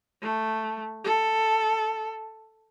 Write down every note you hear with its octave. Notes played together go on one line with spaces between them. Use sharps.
A3
A4